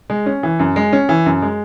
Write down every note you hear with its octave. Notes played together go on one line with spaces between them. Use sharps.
G#3
C#4
E3
F#2
G#3
C#4
E3
F#2
G#3